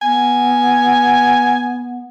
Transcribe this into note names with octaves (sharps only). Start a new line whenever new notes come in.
B3 G#5